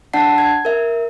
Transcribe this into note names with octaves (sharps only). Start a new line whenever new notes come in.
D4 D5 F#5 A5 C7
G#6
A#4 E5